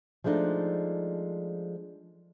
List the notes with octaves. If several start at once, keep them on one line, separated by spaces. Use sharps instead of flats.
F3 G#3 A3 D4 D#4